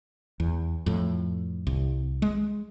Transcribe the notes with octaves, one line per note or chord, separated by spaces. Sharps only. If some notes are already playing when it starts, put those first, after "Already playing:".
E2
F2 A2
C2
G#3